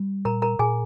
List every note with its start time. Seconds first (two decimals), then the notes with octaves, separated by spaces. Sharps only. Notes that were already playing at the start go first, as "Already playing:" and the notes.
Already playing: G3
0.25 A#2 A#4 A#5
0.42 A#4 A#5
0.59 A#2 G#4 G#5